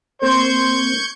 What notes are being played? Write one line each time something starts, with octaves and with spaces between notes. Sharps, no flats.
A#3 C4 C5 C#6 G6 G#6